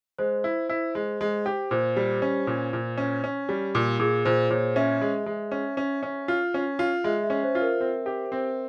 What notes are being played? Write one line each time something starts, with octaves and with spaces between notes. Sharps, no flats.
G#3 C5
E4
E4
G#3
G#3
G4
A#2 C5
G3
C#4
A#2
A#2
C#4
C#4
G3
A#2
A#2 G#4
A#2 C5
A#2 C#5
C#4 E5
G#3
G#3
C#4
C#4
C#4
F4
C#4
F4
G#3 E5
E5
C#4
C5
F4
A#4
C4
G4
C4